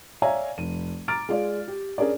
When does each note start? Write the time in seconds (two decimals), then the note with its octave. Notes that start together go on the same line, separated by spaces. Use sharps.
0.22 C#5 D5 E5 F5 G#5 A#5
0.58 F1 D#7
1.08 A#5 D6 F6 A6 D7
1.29 G#3 F4 D5
1.68 G4
1.98 C#4 D4 G#4 A#4 D5